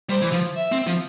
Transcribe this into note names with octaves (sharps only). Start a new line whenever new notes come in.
G3 C5
E3
F3
E5
C4
F3